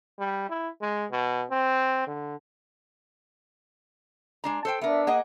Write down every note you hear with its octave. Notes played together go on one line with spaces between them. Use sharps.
G3
E4
G#3
B2
C4
D3
G#3 D4 A#5
A4 C5 G5
B3 D4 A#4 E5
A#3 G#4 D#5 F#5